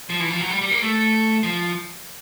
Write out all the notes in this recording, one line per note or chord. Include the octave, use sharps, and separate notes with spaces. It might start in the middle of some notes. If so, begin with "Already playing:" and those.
F3
E3
F3
F#3
G3
G3
A#3
A3
F3